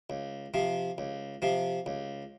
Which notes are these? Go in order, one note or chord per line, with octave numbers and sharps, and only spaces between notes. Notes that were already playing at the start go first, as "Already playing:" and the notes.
C#2
C3 F3
C#2
C3 F3
C#2